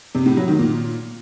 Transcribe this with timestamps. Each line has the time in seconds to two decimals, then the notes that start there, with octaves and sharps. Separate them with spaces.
0.15 C3
0.26 A2
0.37 F#3
0.48 D#3
0.59 A#2